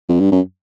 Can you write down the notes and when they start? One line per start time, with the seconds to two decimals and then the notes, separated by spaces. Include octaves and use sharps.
0.09 F2
0.20 G2
0.32 F#2